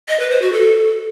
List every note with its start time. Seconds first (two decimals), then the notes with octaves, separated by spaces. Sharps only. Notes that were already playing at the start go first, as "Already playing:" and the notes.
0.09 D#5
0.20 B4
0.31 C5
0.42 F#4
0.53 A4